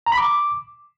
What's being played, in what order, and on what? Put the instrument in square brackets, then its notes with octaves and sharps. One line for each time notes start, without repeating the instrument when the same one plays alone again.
[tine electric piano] A#5
B5
D6